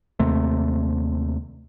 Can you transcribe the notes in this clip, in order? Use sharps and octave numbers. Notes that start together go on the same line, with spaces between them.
D#2 C3 A3